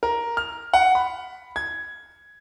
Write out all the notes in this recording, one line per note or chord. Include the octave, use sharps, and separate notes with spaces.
A#4
F6
F#5
B5
G#6